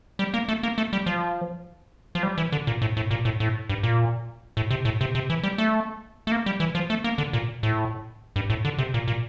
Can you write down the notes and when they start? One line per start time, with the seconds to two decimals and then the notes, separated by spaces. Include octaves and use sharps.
0.19 G3
0.34 A#3
0.48 A3
0.63 A#3
0.78 A3
0.93 G3
1.06 F3
2.15 F3
2.23 G3
2.38 E3
2.52 D3
2.67 A#2
2.82 A2
2.97 A2
3.11 A#2
3.25 A2
3.40 A2
3.69 G2
3.83 A#2
4.57 A2
4.71 C3
4.85 A2
5.01 C3
5.15 C3
5.30 E3
5.43 G3
5.58 A3
6.27 A3
6.32 A#3
6.46 G3
6.60 E3
6.75 F3
6.90 A3
7.04 A#3
7.18 D3
7.33 A#2
7.63 A2
8.36 G2
8.50 A2
8.65 D3
8.78 C3
8.94 A#2
9.08 A#2